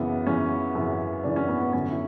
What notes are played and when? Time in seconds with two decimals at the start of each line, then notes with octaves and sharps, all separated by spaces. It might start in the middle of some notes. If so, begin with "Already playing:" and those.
Already playing: F#2 C#3 E3 B3
0.27 F#2 C#3 E3 C#4
0.75 F#2 C#3 E3
1.24 F#2 C#3 E3 D4
1.36 C#4
1.49 B3
1.61 B3
1.73 F#2 D3 F#3 C#4
1.91 E4